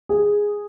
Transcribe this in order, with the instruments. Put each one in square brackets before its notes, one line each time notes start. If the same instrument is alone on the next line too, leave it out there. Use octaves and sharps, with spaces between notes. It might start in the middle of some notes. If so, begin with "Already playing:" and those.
[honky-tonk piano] G#4